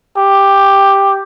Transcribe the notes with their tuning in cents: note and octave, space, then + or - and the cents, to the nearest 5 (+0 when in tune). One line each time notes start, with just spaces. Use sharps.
G4 +5